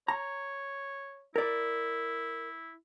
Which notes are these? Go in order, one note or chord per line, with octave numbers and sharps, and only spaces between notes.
C#5 A#5
E4 A#4 D5